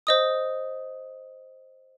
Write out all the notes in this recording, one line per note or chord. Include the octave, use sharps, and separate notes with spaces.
C5 D#5 D#6